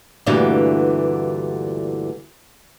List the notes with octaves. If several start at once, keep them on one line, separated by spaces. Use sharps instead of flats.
D2 G2 A#2 D3 E3